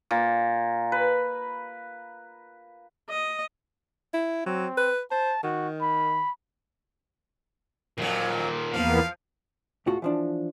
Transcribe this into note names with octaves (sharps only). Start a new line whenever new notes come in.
A#2
B4
D#5
E4
F#3 C4
B4
C5 A5
D#3 F#4
B5
F2 A#2 D#3 F#3
E2 F3 A#3 B3 F5
C#2 A2 F4 F#4
E3 F3 D4